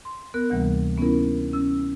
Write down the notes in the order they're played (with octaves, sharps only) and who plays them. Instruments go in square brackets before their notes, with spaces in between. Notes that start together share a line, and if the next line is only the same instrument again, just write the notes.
[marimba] C6
B3 A#4 F#6
D2 C3 E3 G3 A#3 F#5
B3 C#4 D#4 E4 A#4
C#4 E6